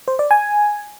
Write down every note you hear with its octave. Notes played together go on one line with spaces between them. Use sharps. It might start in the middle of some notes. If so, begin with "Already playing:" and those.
C5
D5
G#5